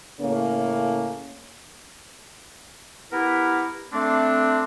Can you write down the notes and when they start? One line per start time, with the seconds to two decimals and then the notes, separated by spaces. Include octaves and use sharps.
0.20 A2 C#3 A#3 C#4
3.12 B3 E4 G4 A#4 B4
3.92 A3 C4 D4